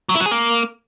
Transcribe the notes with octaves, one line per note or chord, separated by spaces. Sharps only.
F#3
E4
F#3
G#4
A#3